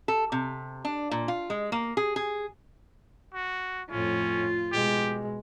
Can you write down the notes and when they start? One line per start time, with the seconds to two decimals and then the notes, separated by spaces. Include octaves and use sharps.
0.08 A4
0.32 C3
0.85 D4
1.11 A#2
1.28 F4
1.50 G#3
1.72 A#3
1.97 G#4
2.16 G#4
3.34 F#4
3.91 F2 A2 C#4 F4
4.72 B2 G#3 G4